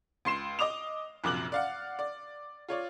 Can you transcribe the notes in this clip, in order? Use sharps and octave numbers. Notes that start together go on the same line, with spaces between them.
C#2 C6 C7 E7
D#5 D6 D#6 F7
A#1 F#2 C3 D6 F#6 F#7
D5 F5 F#5
D5
F4 C#5 D5